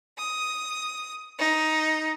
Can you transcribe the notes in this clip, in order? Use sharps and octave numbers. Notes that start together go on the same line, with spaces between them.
D#6
D#4